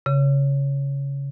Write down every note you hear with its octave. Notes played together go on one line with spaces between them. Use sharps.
C#3